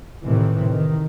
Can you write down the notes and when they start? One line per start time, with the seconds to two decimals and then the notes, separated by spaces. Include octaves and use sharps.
0.24 A2 C3 D#3 E3
0.69 D#3